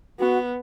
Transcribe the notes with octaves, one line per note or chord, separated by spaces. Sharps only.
B3 F#4